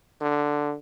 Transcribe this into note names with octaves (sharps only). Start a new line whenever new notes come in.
D3